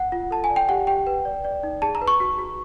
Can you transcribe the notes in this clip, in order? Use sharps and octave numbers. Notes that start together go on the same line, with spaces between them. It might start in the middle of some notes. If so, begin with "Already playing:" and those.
Already playing: F#5
F4
A4 A5
G#5
D5
G5
G4 F#5
G4 G5
B4
D5
D5
D#4
G#4 A5
A#5
B4
C#6
F#4
F#4